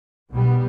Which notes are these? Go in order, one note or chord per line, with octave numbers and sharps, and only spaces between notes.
B1 B2 G3 B3